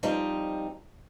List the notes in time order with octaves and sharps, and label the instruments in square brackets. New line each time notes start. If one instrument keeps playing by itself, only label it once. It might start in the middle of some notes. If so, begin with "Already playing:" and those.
[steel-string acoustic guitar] F3 G3 C4 D#4